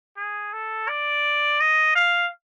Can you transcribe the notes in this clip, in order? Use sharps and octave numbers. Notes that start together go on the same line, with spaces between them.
G#4
A4
D5
D#5
F5